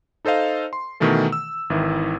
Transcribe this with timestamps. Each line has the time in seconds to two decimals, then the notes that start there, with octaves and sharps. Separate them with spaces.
0.25 D#4 A4 C5 D#5 F5
0.73 C6
1.00 B2 D#3 E3 A3 A4
1.32 E6
1.70 G#1 D#3 E3 E4